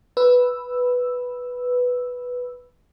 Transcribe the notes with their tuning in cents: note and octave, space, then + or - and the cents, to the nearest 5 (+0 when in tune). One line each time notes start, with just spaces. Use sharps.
B4 +0 E6 +0